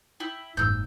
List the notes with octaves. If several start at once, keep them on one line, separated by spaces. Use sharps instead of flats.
E4 G5
F#1 G#2 E6 G6